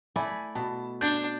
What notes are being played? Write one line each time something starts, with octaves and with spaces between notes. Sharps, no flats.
A3 E4 D5 G#5
B2 A5
D4 G6 A6